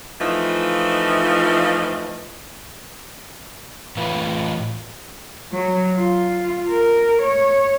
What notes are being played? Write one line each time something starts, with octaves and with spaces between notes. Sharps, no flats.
E3 F3 A3 D#4 F4
A2 E3 F4 B4
F#3
F4
A#4
C#5